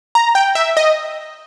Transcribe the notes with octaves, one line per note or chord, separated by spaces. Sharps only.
A#5
G5
E5
D#5